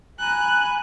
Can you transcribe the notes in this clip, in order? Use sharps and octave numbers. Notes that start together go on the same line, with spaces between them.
G#5 A#5 B5 F#6